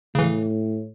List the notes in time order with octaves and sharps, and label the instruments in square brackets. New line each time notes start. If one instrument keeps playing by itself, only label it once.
[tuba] A2 [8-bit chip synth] C#3 E3